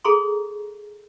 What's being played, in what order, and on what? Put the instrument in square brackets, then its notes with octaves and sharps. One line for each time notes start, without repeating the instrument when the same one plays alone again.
[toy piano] G#4 A4 A#5 C6 C#6